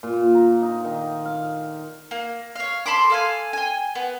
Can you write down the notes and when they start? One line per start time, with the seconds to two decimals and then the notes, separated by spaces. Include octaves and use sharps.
0.03 A#2
0.35 A#5
0.62 D#4
0.84 D#3
1.25 F5
2.11 A#3
2.56 C#5 F5
2.86 A4 B5 C6 D6
3.10 A4 F5 G#5
3.53 G5 G#5
3.95 B3